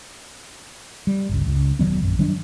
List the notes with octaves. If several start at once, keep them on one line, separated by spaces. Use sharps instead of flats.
G3
G1 C#2
C#2
E1 D#3 F#3 B3
A#1 F#2
D#3 F#3 G3 D4